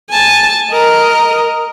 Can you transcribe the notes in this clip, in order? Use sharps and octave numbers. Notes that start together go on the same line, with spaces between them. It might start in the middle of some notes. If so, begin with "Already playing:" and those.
G#5 A5
A#4 D#5